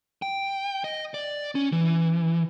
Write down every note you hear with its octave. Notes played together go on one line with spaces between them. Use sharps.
G5
D#5
D5
C#4
E3